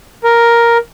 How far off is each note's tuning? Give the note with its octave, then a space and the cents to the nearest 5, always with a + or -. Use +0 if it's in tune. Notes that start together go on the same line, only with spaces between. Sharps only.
A#4 +5